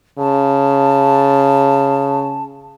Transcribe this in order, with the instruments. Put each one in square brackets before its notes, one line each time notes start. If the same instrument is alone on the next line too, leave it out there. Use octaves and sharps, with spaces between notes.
[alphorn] C#3 [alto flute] A5